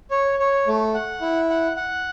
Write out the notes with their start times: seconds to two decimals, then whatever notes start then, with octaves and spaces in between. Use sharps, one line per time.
0.11 C#5
0.39 C#5
0.67 A3
0.94 F#5
1.21 E4
1.50 F#5
1.77 F#5